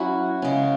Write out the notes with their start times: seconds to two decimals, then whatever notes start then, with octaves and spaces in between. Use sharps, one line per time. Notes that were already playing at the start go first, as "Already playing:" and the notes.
Already playing: F#3 C#4 E4 F#4
0.42 C#3 G#3 C#4